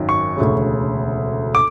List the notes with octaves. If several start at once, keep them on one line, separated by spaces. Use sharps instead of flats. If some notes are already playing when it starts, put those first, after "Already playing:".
Already playing: G#1 F#2 D#3
C#6
E1 D2 C#3
D6